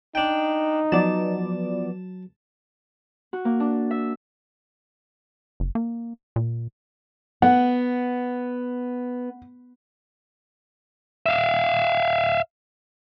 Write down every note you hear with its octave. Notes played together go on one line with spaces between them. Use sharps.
D4 D#4 G5
F3 F#3 B3 D5 A5
F#4
A#3
D4
E5
F#1
A#3
A#2
B3 F#5
E5 F5